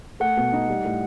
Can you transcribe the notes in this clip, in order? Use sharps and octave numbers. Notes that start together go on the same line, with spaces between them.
A3 F#5
B2
D#4
G3
A2